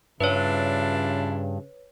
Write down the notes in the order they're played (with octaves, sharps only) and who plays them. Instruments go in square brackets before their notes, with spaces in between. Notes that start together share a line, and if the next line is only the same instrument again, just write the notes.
[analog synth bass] G2 [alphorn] C#3 [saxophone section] D4 E4 F4 [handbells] B4 C#5